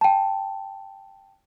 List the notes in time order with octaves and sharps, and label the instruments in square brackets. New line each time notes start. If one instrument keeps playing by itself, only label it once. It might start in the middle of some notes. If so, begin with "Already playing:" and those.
[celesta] G5 A5